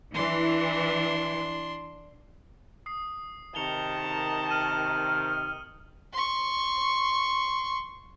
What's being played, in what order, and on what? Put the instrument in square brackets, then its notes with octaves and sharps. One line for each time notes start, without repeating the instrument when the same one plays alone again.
[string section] E3 [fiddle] D4 C6
[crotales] D#6 C7
[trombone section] C3 D#3 [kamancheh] A5 A#5 [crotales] C#7 F7 G7
[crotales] D#6
[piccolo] F6 [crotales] D#7 F#7
[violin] C6 C#6